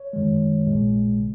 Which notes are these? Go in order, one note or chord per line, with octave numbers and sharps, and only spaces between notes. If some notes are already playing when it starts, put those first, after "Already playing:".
Already playing: C#5
F#2 D#3 G#3
A#1 A#2 G#3
C#3